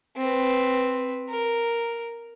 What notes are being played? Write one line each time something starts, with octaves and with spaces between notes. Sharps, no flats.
C4 B4
A#4